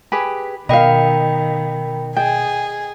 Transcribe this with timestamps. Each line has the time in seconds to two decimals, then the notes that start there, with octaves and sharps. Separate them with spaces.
0.12 G4 G#4 B4
0.69 B2 D#3 A#4 D#5 F5 G5 B5
2.17 G#4 D#5 G5